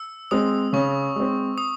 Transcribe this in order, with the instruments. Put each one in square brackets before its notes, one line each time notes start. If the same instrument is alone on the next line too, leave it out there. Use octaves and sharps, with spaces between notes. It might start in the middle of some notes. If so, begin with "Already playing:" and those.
Already playing: [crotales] E6
[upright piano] G#3 C4 [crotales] D#6
[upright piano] C#3 [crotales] C#6
[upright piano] G#3 C4
[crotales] D#6